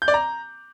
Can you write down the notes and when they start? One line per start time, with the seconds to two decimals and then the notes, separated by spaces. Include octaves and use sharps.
0.02 G6
0.08 D5
0.14 A#5